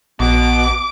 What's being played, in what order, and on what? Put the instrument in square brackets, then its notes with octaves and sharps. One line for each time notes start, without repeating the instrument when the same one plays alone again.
[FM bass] A#1 [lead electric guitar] B2 [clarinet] B3 [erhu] D6